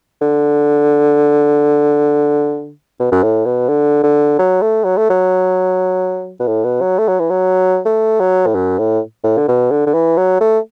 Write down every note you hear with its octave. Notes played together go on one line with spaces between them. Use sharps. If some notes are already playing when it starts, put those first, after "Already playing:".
D3
B2
F#2
A2
B2
D3
D3
F#3
A3
F#3
A3
F#3
B2
A2
B2
F#3
A3
F#3
E3
F#3
A3
F#3
A2
F#2
A2
A2
D3
B2
D3
D3
E3
F#3
A3